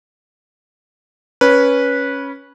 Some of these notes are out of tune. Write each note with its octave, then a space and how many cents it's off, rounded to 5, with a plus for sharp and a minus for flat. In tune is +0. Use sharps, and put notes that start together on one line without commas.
C#4 +0 B4 -15